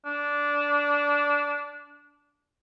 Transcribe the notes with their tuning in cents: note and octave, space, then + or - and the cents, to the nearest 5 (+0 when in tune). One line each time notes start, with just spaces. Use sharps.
D4 -15